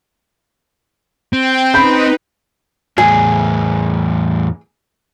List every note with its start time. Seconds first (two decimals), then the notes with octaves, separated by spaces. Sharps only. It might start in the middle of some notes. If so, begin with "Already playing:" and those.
1.33 C4 G5
1.74 D#4 B4 B5 G6
2.98 E2 A2 G#4